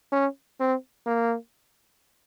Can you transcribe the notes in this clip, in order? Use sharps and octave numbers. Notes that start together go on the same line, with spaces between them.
C#4
C4
A#3